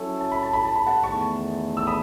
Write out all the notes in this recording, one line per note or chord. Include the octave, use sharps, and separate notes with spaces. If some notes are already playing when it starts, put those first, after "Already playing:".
Already playing: F#3 C#4 E4 A4
A5
B5
A5
B5
A5
B5
F#5 A5
E2 D#3 A3 A5 C#6
E6
B5 D#6